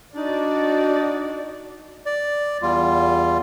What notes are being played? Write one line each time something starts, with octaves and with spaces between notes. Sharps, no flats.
D4 D#4 F#4 D5
D5
E2 G3 F4